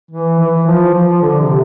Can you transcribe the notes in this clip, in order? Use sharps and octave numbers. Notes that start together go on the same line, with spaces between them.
E3
E3
F3
F3
D3
C3